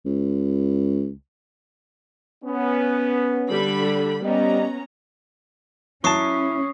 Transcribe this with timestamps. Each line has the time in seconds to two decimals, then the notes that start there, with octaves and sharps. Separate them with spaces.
0.05 C#2
2.43 B3 C#4
3.49 D3 G3 B5
4.24 G3 B3 C#4 D#5 A#5
6.04 F#3 C#4 E4 A5 C#6 D#6 C7